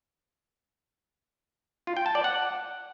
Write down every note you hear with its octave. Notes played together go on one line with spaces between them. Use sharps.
F4
G5
A5
D5
F#5